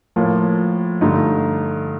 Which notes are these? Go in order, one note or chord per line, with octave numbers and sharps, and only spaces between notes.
A2 F3 A#3 F4
G2 D3 A3 D#4